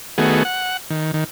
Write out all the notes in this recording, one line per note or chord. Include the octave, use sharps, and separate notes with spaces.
D#3 A3 B3 F#4 G#4
F#5
D#3
D#3